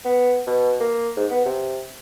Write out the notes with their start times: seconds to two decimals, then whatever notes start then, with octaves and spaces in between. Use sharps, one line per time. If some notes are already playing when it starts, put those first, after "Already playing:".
0.05 B3
0.47 B2
0.80 A#3
1.17 G#2
1.31 B3
1.45 C3